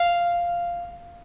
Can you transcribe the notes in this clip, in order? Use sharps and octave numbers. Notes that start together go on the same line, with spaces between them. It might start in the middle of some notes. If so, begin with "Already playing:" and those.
Already playing: F5